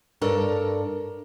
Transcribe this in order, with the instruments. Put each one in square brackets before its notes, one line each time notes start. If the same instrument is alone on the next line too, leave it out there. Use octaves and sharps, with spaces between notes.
[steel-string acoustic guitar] G2 D4 A4 A#4 C#5